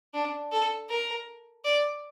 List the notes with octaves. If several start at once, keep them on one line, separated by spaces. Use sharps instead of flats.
D4
A4
A#4
D5